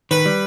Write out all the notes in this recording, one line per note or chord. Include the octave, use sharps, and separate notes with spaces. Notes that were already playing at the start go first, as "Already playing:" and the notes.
D#3 B4
G3